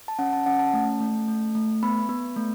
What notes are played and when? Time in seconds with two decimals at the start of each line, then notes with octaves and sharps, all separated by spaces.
0.08 A5
0.19 C#4 F#5
0.33 A5
0.46 C#4 F#5
0.59 A5
0.74 A3
1.00 A3
1.28 A3
1.55 A3
1.83 B3 B5
2.09 B3
2.36 A3